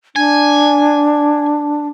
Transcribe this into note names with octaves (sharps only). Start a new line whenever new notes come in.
D4 G#5